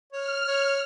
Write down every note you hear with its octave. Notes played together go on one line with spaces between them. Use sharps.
C#5 F6
C#5